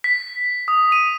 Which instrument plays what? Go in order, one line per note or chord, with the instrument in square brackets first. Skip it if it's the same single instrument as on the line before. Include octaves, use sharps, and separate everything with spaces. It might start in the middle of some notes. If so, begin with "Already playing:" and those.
[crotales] B6
D#6
D#7